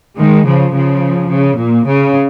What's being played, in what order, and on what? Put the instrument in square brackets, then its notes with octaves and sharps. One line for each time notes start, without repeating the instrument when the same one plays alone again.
[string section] D#3 G#3
C#3 F3
C#3 F3
C#3
A#2
C#3